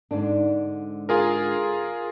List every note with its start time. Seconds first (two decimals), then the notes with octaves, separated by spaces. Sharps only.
0.11 G#2 D3 D4
1.09 F4 G#4 A#4